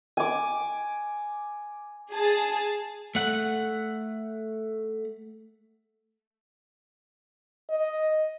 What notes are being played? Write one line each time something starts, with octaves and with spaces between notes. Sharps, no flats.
G#5 D6
G#4 A5
A3 F#5
D#5